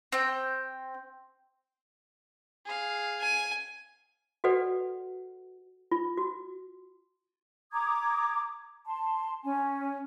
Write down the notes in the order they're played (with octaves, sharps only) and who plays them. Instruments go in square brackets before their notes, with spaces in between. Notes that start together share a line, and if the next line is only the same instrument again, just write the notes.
[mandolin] C4 G5
[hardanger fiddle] G#4 F5
[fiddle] G#5
[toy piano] F#4 A4 B4 D5 F#5
F4
F#4
[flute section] A#5 D6 D#6 G#6
A5 C6
C#4 G#5